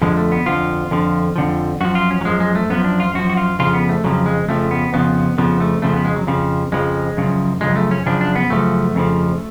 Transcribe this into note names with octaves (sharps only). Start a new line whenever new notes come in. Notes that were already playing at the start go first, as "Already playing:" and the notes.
F2 D3 F3 G#3
A3
B3
F2 D3 F3 F4
F2 D3 F3
F2 D3 F3
F#2 F3 F#4
F4
C#4
F#3
F#2 F3 G#3
G#3
A3
F#2 F3 B3
D4
F4
F#2 F3 F#4
F#4
F4
F2 C#3 F3 F4
B3
A3
F2 C#3 F3 F#3
G#3
F2 C#3 F3 A3
B3
F2 C#3 F3 B3
F2 C#3 F3 B3
A3
F2 C#3 F3 A3
B3
G#3
F#3
F2 C#3 F3
F2 C#3 F3 G#3
F#2 C#3 F3
F#2 C#3 F3 G#3
A3
C#4
F#2 C#3 F3 D4
D4
B3
F#2 C#3 F3 A3
F2 C#3 F3